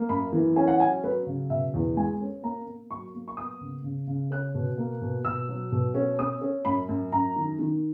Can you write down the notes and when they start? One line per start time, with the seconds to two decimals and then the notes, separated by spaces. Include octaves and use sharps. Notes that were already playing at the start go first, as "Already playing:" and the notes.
Already playing: A#3
0.09 F#2 B5
0.33 E3
0.56 C#4 G#5
0.68 F#5
0.80 F#3 G#5
1.04 F#3 B4
1.27 C#3
1.50 B2 E5
1.74 E2
1.97 G#3 G#5
2.21 C#4
2.43 A#3 A#5
2.67 A#3
2.91 F#3 C#6
3.14 A#3
3.28 C#6
3.37 B3 D#6
3.61 C#3
3.84 C#3
4.07 C#3
4.31 C#4 F#6
4.55 B2
4.78 A#3
5.02 B2
5.25 B2 E6
5.49 F#3
5.72 B2
5.95 C#4
6.19 C#4 D#6
6.42 C#4
6.65 F#2 B5
6.89 F#2
7.12 F#2 A#5
7.36 D#3
7.59 D#3